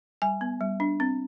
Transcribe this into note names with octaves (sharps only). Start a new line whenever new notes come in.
G3 G#5
B3
G3
D4
C4